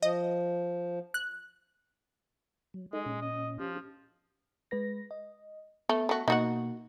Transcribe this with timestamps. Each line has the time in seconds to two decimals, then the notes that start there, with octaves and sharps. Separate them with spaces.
0.03 F3 D#5
1.14 F#6
2.74 F#3
2.93 G#3 D#4 A4 D#5
3.06 A#2 C#4
3.21 D#5
3.59 F3 C#4 G4
4.71 G#3 B4 A#6
5.11 D#5
5.89 A3 B3
6.09 A3 F#4
6.28 B2 A#3 D#4 F#4 F#5